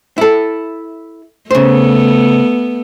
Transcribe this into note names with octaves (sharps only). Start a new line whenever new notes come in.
E4 A4
C#3 A3 B3 C5